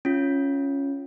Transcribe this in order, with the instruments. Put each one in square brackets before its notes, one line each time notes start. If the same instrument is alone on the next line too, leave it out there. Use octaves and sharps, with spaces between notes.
[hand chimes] C#4 F4